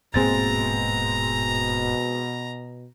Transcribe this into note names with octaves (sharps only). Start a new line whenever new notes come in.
D1 G#2 B2 G#3 A#3 C4 A#5 A6